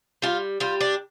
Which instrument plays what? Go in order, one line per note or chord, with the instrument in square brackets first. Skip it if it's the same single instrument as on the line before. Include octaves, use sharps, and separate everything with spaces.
[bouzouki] G3 F4
G3 F4
D4